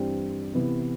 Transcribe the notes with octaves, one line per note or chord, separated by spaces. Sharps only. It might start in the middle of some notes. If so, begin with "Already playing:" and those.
Already playing: G2 E3 G3 C4
C3 E3 B3